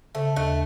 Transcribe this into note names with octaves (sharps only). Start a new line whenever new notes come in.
C#3 A3
D#2 A3